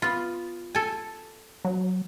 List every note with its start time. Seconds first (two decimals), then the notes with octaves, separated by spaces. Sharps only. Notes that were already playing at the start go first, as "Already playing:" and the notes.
0.02 B3 F4
0.75 A4 G#5
1.65 F#3